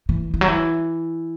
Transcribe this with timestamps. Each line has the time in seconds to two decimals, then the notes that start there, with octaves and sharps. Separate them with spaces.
0.09 E3
0.34 E3
0.41 F#3
0.48 E3